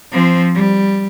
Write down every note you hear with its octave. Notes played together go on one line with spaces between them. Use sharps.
F3 C4
G3